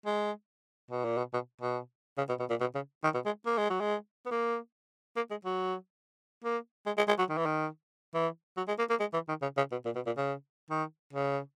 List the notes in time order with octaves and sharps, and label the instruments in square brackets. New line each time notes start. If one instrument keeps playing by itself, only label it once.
[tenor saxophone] G#3
B2
A#2
B2
B2
B2
C#3
B2
B2
A#2
B2
C#3
D#3
B2
G#3
A#3
G#3
F#3
G#3
B3
A#3
A#3
G#3
F#3
A#3
G#3
G#3
G#3
F#3
D#3
E3
D#3
E3
F#3
G#3
A#3
A#3
G#3
E3
D#3
C#3
C#3
B2
A#2
B2
A#2
C#3
D#3
C#3